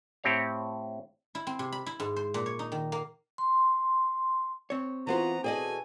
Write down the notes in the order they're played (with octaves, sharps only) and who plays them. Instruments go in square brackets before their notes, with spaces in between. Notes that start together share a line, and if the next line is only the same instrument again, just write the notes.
[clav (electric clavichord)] A2 C4 G4 C#5 F5
[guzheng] E4
C4
C3
B5
E4
G#2
C5
A#2
C#5
D#4
D#3
A#3
[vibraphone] C6
[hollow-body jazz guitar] C4 C#5
[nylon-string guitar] E3 B3 C5 [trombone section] F4 F#4 [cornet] A#5
[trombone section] B2 F#4 A4 [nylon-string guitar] G#4 D5 D#5 [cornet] G#5